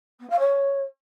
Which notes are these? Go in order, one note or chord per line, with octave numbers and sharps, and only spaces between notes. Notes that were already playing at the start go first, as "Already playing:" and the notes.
B3
F5
C#5